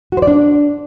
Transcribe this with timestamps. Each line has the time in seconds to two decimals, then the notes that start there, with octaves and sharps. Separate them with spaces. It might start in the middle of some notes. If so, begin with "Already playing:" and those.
0.12 F#4
0.17 C5
0.22 D5
0.27 D4